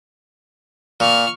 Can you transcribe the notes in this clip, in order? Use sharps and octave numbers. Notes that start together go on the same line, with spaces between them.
A#2 C#6 F6